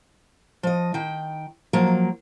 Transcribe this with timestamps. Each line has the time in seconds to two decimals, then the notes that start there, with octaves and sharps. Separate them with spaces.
0.63 F3 D#5
0.94 D#3 G5
1.73 F3 F#3 A#3